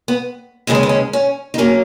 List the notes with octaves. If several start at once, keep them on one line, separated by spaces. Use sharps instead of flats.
B3
D#2 C#3 G#3 B3 D#4
C#4
B3
C#4
C#4
D#4
F#3 A#3 C#4